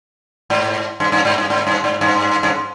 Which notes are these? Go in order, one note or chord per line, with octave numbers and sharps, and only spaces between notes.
G#2
G2
G2
G#2
G2
G#2
G2
G#2
G2
G2